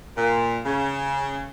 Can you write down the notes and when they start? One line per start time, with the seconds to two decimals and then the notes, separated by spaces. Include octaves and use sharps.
0.16 A#2
0.65 C#3